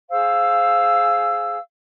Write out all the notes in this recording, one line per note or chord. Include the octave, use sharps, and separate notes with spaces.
G#4 C5 F5 E6